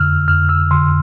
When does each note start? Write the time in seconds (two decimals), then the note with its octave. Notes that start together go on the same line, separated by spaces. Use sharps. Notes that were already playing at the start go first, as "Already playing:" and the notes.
Already playing: F2 D3 E6 F6
0.28 F2 F6
0.49 E6
0.71 D3 C6